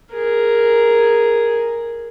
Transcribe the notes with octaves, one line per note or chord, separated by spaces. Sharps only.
G#4 A#4